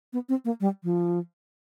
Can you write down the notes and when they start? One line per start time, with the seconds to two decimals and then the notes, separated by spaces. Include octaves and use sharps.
0.13 B3
0.29 C4
0.45 A#3
0.61 G3
0.84 F3